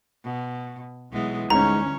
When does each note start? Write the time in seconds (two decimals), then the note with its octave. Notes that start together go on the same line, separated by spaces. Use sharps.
0.24 B2
1.13 B1 E3 G#3 B3
1.50 D2 G#2 G3 C#4 C#5 A#5